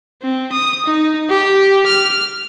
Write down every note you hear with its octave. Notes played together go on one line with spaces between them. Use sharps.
C4
D#6
D#4
G4
F6